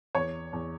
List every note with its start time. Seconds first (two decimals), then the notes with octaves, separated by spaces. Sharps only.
0.15 E2 C#5
0.53 E2